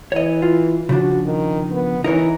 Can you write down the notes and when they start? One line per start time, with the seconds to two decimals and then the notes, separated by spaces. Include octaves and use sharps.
0.12 E3 C#5 D#5
0.42 F4
0.89 C#3 F3 D4 F#4
1.26 D#3
1.71 B3
2.04 E3 D#4 A#4 C#5